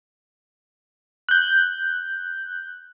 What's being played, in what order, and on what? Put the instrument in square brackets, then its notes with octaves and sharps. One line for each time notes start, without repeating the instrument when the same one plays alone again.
[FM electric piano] F#6 G6